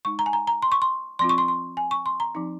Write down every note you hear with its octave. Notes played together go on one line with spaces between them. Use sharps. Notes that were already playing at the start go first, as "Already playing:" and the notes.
G#3 D#4 C#6
A#5
G#5
A#5
A#5
C6
C#6
C6
F3 C4 F4 C6
C#6
C6
C6
G#5
C#6
C6
A#5
F3 C4 D#4